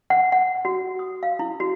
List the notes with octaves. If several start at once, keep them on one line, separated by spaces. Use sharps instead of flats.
F#5
F#5
F#4
D#6
F5
E4
F#4